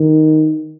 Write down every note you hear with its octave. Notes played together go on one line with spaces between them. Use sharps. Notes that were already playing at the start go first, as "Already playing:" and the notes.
Already playing: D#3